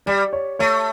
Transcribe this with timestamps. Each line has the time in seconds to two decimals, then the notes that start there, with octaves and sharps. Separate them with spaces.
0.06 G3 D5
0.33 C#5
0.59 A3 C#5